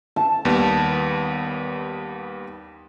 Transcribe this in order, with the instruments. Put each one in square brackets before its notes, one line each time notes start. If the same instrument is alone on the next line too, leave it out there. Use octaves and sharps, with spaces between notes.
[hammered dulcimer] A5
[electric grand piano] D#2 G3 B3